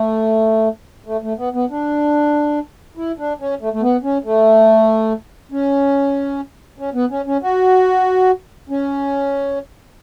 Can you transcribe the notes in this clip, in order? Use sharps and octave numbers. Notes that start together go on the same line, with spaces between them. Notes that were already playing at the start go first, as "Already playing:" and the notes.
Already playing: A3
A3
A3
B3
B3
D4
E4
D4
C#4
A3
A3
B3
C#4
A3
C#4
C#4
B3
C#4
C#4
F#4
C#4